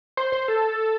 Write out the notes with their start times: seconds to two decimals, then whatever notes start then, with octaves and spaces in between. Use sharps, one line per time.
0.17 C5
0.32 C5
0.48 A4